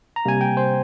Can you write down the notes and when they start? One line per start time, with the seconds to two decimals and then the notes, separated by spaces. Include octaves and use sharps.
0.16 A#5
0.25 C3 G3 A#3 G#5
0.41 G5
0.57 C5